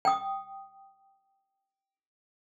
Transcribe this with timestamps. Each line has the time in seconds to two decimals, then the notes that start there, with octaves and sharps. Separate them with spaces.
0.05 G5 D#6